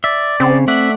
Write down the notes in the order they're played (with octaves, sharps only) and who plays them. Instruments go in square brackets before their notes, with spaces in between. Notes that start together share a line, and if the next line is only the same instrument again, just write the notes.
[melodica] D5 [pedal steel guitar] E5
[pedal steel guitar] C#3 [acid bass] C4
[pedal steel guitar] A3 D5 F#5 [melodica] E5